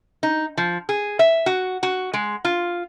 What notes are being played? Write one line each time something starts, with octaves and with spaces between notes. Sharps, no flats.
D#4
F3
G#4
E5
F#4
F#4
G#3
F4